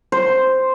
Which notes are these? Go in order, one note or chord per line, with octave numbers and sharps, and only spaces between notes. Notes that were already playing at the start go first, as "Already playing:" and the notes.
C5